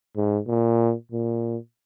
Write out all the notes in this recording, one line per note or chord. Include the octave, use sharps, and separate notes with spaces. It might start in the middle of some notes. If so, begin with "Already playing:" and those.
G#2
A#2
A#2